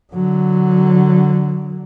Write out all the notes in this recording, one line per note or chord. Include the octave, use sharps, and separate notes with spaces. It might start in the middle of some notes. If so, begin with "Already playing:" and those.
D3 F#3